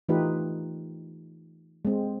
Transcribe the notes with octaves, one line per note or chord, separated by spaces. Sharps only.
E3 A3 D#4 F4 G4 B4
G#3 C4